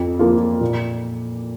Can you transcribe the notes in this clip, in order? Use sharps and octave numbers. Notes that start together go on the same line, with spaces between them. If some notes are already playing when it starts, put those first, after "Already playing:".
Already playing: F2
F3 A#3 F4
A#2